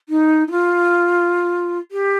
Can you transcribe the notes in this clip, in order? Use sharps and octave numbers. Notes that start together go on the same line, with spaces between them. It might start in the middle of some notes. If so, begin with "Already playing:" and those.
D#4
D#4
F4
G4